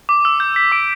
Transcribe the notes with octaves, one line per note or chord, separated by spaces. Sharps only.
D6
E6
G6
B6
D6 D7